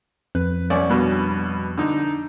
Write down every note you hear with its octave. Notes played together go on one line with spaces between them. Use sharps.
F2 B4
C2 C#4 D5
G2 B2
D3 D#4